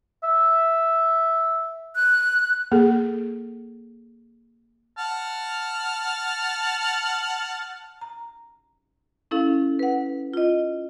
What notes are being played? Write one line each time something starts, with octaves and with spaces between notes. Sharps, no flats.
E5
F#6
A#3 G#4 A4
F#5 A5 F6
A#5
C#4 E4 A4 F5
B4 F#5
F4 D#5